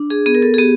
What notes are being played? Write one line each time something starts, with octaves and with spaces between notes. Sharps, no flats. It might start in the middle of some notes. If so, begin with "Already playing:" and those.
Already playing: D4
G#4
B3 G#4
A#4
A4
G#4
B3 G4